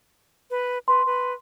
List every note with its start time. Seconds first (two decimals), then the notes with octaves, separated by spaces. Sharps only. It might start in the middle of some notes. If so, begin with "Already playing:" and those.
0.51 B4
0.88 B4 C6
1.06 B4